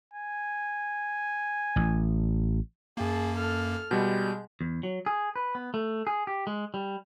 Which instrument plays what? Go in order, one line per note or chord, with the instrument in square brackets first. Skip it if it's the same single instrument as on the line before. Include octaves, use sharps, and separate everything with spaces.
[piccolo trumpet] G#5
[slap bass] A1
[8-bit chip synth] F#2 A#3 [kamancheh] G#4 A5
[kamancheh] A4 F6
[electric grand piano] B2 G3 [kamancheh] G#3 [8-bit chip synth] G6
[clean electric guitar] E2
F#3
G#4
B4
B3
A3
G#4
G4
G#3
G3